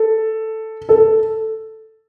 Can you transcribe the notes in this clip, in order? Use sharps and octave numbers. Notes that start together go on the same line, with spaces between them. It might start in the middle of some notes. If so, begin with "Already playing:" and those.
Already playing: A4
A4